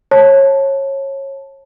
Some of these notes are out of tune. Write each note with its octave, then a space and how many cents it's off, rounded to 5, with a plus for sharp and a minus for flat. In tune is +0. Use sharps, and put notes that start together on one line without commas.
C#5 -25 A5 +0